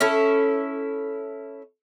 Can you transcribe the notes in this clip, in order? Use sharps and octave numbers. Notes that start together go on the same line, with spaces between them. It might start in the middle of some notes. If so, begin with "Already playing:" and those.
C#4 E4 A4